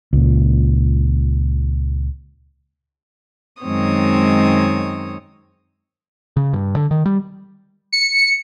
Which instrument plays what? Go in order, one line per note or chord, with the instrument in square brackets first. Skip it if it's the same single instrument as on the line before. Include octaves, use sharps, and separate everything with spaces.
[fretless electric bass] C#2 A#2
[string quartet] F#2 D#3 G#3 C4 C#5 D#6
[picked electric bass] C#3
G2
D3
D#3
G3
[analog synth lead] C#7